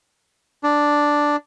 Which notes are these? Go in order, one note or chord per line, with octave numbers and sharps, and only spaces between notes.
D4